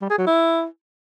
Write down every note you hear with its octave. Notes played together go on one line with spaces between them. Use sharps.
G3
G#4
F#3
E4